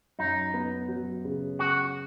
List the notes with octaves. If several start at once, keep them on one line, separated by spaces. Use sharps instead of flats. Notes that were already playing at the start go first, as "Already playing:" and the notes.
F#2 D#4
B3
F#3
C#3
C#3 F#4